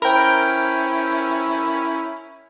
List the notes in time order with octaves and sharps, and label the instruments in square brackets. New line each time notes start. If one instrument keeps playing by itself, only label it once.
[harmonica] C#4 E4 [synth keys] A#4 G5 [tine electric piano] C5 B5